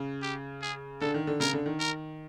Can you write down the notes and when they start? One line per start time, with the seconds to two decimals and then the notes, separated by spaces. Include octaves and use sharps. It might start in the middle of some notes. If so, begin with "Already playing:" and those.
Already playing: C#3
0.23 G4
0.62 G#4
1.01 D3 A4
1.14 D#3
1.27 D3
1.40 C#3 A#4
1.53 D3
1.66 D#3
1.80 A#4